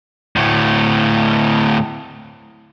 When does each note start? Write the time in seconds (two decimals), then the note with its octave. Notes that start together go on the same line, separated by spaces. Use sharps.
0.36 D2 A2